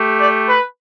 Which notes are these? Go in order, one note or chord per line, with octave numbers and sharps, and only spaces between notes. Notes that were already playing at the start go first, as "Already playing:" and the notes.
Already playing: A3 G4
D5
B4